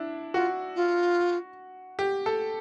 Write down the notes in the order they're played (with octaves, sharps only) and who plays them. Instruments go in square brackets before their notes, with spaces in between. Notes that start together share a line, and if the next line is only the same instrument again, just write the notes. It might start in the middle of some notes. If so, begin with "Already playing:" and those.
Already playing: [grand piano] D4 E4
[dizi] F4 [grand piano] F#4
[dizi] F4
[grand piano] G4
A4